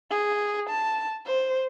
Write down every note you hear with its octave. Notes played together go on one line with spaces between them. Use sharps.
G#4
A5
C5